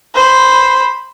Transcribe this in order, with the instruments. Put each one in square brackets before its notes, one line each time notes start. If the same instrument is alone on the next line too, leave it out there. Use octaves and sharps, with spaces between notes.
[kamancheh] C5 B5